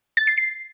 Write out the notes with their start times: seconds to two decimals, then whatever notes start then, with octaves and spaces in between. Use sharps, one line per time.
0.17 A6
0.27 C7
0.38 C7